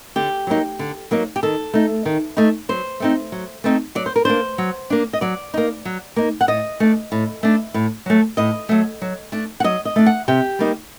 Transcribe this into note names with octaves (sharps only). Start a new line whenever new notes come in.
D3 G4
F#3 A#3 D#4
D3
F#3 A#3 D#4
G4
D#3 A4
A3 D#4
D#3
A3 D#4
F#3 C5
A3 C4 D#4
F#3
A3 C4 D#4
F#3 D5
C5
A#4
A#3 D4 C5
F#3
A#3 D4
D#5
F#3 D5
A#3 D#4
F#3
A#3 D#4
F#5
A2 D#5
A3 D4
A2
A3 D4
A2
F#3 A3
A2 D#5
F#3 A3
F#3
A3 D4
F#5
F#3 D#5
D#5
A3 D4
F#5
C3 G4
G3 A#3 D#4